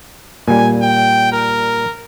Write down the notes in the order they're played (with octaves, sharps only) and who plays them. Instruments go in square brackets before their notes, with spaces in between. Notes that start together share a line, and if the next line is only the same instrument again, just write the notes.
[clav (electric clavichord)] A#2 G3 [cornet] G#5
[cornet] G5
A#4